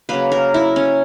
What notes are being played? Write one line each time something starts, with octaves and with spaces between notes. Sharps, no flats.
C#3 F#3 A#3 B4
A#4
E4
C#4